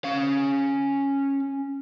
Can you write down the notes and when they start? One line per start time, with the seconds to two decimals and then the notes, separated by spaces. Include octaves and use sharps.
0.04 C#4 F5